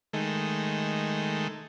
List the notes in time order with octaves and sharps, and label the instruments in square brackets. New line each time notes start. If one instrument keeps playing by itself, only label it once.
[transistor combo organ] D#3 G#3 A3